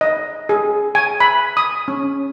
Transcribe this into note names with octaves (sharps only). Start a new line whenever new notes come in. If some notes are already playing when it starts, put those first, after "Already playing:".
D#5
G#4
G#5
B5
D#6
C#4